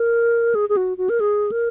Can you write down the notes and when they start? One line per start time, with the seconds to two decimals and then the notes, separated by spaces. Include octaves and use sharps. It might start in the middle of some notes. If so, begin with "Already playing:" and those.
Already playing: A#4
0.55 G#4
0.69 G#4
0.77 F#4
0.98 F#4
1.09 A#4
1.20 G#4
1.52 A#4